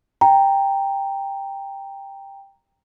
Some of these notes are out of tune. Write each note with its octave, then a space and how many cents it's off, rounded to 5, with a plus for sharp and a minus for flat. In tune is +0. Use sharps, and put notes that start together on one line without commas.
G5 +10 A#5 +0